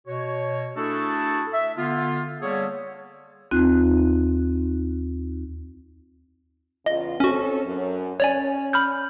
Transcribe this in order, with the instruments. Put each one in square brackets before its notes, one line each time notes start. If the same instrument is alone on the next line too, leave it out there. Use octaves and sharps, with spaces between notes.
[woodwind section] B2 F#4 C#5
A3 D4 E4 F#4 G#4 A4
E5
D3 B3 F4
G3 A#3 B3 G#4 A4 C#5
[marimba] D#2 C4 D#4 F4 F#6
[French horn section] E2 C#3 F4 [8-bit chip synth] D#5
[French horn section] C4 A4 C#5 [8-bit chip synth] C#4 F#4
[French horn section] F#2
[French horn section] C#4 [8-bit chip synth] C#5 D5 G#5
[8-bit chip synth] B5 F6 G6